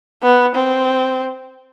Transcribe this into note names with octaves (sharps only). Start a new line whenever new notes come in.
B3
C4